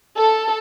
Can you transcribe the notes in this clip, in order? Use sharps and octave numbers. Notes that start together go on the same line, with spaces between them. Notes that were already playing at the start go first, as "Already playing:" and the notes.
A4